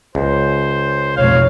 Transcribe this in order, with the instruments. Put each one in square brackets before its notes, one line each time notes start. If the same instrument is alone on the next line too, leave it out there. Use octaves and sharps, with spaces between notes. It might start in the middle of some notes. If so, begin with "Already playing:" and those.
[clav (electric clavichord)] C#2 [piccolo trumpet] C5
[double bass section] F1 B1 [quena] C#5 [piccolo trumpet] F5